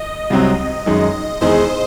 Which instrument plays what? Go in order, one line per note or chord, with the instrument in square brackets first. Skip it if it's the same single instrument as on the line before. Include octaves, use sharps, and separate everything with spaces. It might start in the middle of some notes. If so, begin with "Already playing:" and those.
Already playing: [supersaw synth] D#5
[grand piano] C2 C3 F#3 C4
F#2 D#3 G#3
[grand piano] E2 D#3 G#3 D#4 G#4 [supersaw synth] C5